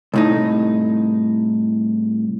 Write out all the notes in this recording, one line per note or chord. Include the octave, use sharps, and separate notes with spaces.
C2 A2 D#4